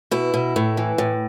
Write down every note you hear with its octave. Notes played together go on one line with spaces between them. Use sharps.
B2 E4
B2
A2
E3
A2